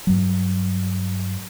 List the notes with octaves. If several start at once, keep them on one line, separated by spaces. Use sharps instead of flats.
G2 F#3